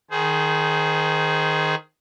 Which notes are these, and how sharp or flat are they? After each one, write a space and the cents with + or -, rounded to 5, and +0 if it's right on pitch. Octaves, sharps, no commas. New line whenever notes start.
D#3 +0 G#4 +15 C5 -25